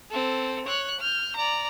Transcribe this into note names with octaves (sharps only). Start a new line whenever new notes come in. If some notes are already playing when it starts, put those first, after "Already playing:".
C4 A4
C#5 F#6
F6 G6
D5 A#5